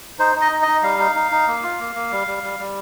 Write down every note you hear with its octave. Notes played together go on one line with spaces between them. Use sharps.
D#4 C5
D#4
D#5
D#4
D#5
D#4
G3 F5
D#4
D#4
D#4
A#3
F4
A#3
A#3
G3
G3
G3
G3